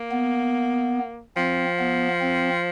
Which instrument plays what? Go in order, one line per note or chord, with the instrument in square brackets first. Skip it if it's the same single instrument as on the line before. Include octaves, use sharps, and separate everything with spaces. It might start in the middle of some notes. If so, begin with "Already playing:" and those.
Already playing: [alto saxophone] A#3
[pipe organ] B3
[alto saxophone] F3 [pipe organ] C4
[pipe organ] B3
C4